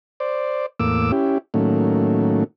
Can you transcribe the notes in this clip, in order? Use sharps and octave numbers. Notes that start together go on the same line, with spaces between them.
C5 D5
E2 A2 A#3 D6 E6
C#4 E4 G4
A2 D#3 F#3 A3 A#3 C#4